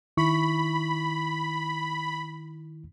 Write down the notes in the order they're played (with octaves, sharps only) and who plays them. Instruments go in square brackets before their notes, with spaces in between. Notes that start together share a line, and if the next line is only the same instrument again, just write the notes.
[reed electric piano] D#3 E4 C#6 [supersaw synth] B5